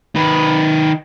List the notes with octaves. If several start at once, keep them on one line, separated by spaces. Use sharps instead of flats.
D#3 B4